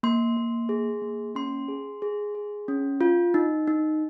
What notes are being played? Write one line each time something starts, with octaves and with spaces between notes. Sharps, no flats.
A#3 C6
A#3
G#4
A#3
C#4 C6
G#4
G#4
G#4
C#4
F4
D#4
D#4